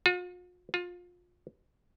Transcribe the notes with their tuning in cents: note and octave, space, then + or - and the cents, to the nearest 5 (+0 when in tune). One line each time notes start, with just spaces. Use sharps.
F4 +45
F4 +25